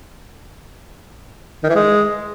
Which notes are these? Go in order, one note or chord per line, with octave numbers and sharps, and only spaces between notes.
D#3
E3
G#3